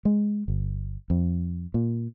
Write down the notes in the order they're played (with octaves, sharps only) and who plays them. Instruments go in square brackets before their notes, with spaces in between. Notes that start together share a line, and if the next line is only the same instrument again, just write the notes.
[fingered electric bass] G#3
G1
F2
A#2